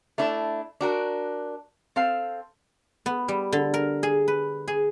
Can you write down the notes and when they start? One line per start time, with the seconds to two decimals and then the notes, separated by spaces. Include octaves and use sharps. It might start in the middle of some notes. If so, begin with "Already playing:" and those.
0.18 A3 D4 E4
0.81 D4 F#4 A#4
1.96 C4 A4 F5
3.06 B3
3.28 G3
3.52 D3
3.74 A#4
4.03 G#4
4.28 B4
4.68 G#4